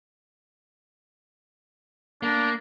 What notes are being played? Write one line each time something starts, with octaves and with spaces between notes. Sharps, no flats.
A#3 D4